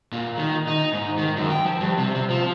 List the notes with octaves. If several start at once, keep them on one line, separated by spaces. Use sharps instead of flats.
A#2
D#3
D#4
G#2
D#3
F#2
G5
F3
G2
C3
C3
F3